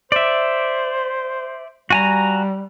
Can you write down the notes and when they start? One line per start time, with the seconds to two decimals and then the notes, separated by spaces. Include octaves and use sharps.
0.12 C5 D5 E5
1.90 G3 F#4 G#5 A#5